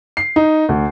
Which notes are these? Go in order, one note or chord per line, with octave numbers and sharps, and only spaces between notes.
C7
D#4
D2